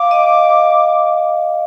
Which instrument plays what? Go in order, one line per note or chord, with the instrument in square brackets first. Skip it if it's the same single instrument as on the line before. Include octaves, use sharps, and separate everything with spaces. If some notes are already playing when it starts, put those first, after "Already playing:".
Already playing: [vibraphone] F5 [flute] D6
[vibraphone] D#5